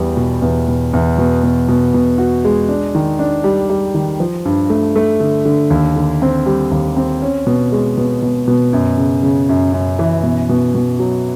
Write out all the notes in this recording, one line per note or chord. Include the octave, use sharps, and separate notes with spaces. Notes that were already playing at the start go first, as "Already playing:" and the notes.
Already playing: E2 G3
B2
E2
B2
E2
B2
B2
B2
B2
F#4
G#3
D4
D#3
D4
G3
G3
D#3
F3
G2
A3
A3
D3
D3
D#2
D3
C4
G3
D#2
C4
C#4
B2
G#3
B2
B2
B2
F#2
C#3
C#3
F#2
F#2
E3
B2
B2
B2
F#3